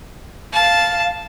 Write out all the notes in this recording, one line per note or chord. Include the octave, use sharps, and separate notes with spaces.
F5 A5